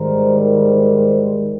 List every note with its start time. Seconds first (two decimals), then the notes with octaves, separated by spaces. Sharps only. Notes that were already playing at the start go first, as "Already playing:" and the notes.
Already playing: G#2 D#3 G3 A#4 C5
0.41 A#4 C5